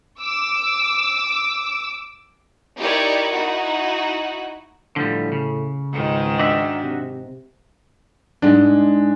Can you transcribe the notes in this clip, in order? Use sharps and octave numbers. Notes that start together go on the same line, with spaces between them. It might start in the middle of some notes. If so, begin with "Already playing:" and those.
D6 E6
D#4 E4 G4 A#4 C#5 D5
D#4 E4 F#4
A2 D3 F3 G3
C#3
C#2 G#2 D#3
D4 F#4 E5
C3
G#2 G#3 D4